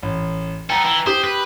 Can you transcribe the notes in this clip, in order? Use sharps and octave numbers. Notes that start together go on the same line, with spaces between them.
A1
B3 A4 G5 A#5
E3
G4 C5 D#6
B4